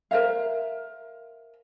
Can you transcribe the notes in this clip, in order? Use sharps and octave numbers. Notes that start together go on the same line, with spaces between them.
A#4 C5 E5 F5